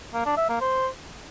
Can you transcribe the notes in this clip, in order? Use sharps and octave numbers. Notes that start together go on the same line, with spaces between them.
A#3
D4
E5
A#3
C5